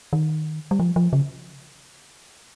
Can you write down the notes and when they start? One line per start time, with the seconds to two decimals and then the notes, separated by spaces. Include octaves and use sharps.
0.13 D#3
0.71 G3
0.80 F3
0.96 F3
1.13 C#3